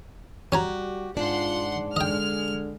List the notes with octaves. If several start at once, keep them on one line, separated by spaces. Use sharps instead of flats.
G3 C#4 F#4 G4 G#5 A#5
G#2 D4 F4 F#5 C6
D3 G#3 D#5 G5 F6